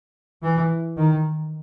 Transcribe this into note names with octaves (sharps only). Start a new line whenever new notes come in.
E3
D#3